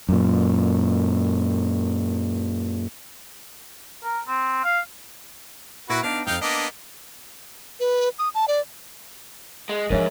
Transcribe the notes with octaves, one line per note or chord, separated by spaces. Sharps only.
F#2 A#2
A#4
C4
F5
A#2 E4 F#4 A#4 B4
B3 D4 D#4 F5
F2 G#2 D#4 F5 G5
A#3 B3 D4 D#5
B4
D#6
A5
D5
G#3
G#2 F3 D4 A#4 C#5 E5